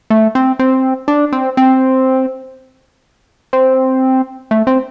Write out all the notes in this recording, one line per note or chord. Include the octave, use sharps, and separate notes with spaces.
A3
C4
C4
D4
C4
C4
C4
A3
C4